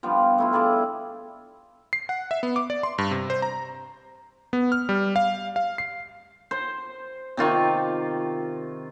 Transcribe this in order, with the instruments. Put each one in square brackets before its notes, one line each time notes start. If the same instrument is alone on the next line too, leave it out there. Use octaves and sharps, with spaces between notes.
[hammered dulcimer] F3 G3 B3 D4
A3 E4 F4
G3 G#4 D5 E5
[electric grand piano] C7
F#5
E5
B3
D6
D5
C6
G2
C3
C5
A#5
B3
F6
G3
F5
F5
C7
[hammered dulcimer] C5
C3 D#3 F4 C#6